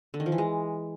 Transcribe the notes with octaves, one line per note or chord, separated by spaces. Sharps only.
D3
D#3
F3
E3
G#3